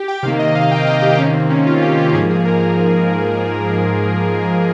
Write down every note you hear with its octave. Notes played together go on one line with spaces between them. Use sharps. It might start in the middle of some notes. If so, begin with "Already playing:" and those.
Already playing: G4
G5
C3 D#3 A#3 F5
D#5
F5
G5
D#5
G4
C3 D#3 A#3 C#4
C4
C#4
F4
G4
G4
G#2 F3 A#3 G#4
G#4
A#4